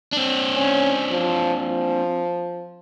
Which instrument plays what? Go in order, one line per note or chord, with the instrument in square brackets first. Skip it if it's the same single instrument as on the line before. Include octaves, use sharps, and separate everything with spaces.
[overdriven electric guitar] C4 D4
[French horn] C#4
F3
F3